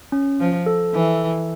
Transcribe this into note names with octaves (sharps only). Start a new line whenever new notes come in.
C#4
F3
A4
E3